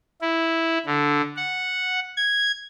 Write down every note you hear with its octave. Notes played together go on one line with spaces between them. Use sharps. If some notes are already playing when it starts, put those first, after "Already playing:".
E4
D3
F#5
G#6